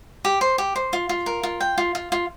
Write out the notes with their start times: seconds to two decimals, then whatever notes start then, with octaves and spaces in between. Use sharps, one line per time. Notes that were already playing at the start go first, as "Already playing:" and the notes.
0.25 G4
0.41 C5
0.58 G4
0.76 C5
0.93 F4
1.09 F4
1.26 A#4
1.43 F4
1.61 G5
1.78 F4
1.95 F4
2.12 F4